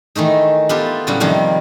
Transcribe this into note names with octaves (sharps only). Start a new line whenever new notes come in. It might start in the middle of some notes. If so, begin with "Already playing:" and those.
D#3 E3 A3 D#4
B3 F4 G4 A4
A2 C#3 F#3 G3 F#4
C3 D#3 F3 G3 A#3